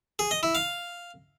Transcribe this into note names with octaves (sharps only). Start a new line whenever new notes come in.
G#4
D#5
E4
F5